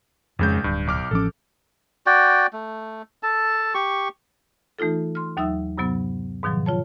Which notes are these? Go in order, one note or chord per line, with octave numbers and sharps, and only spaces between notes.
G#1 F2 C#3 G#3 G6
D1 G2
B1 D6 F6
A1 F3 C#4 A4 D6
F#4 D5 G5
A3
A4 A5
G4 C#6
E3 A3 D#4 F4 A4
C6 F6
D#2 F#3 D#4 E5 D#6 E6
G2 C3 F#3 B3
G#2 B2 D#3 F3 F#3
F4 C#5 A5